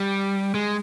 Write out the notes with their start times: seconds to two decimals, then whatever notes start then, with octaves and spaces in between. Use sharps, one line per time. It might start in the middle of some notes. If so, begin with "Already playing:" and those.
Already playing: G3
0.55 G#3